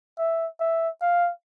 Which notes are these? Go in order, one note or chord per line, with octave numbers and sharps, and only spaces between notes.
E5
E5
F5